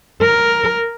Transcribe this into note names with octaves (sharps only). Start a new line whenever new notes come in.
A#4